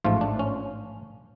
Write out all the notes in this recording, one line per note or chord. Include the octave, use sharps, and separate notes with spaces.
A1 G#2 F3 A3 F4
D4
C#4